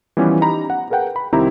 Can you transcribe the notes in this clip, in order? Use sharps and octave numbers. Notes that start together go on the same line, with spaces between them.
E3 F3 G3 B3 C#4 G4
D#4 G4 A#5 B5
F#5
G#4 A#4 B4 F#5 G5
B5
C2 D#3 C4 E4 G4 A#5